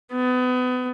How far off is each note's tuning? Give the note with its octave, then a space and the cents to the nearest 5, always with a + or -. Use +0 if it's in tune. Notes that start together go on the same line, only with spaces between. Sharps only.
B3 +30